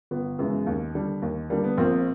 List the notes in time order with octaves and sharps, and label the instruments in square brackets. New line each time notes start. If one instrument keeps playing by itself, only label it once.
[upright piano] G1 B3
F#2 C#3 E3 G#3
D#2
D3 G3
D#2
D3 G3 A#3
B3
A#1 A#3 C4